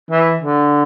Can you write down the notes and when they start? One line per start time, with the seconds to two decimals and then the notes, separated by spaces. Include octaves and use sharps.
0.10 E3
0.42 D3